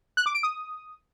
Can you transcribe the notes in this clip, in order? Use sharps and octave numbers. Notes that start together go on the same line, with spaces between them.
F#6
D6
D7
D#6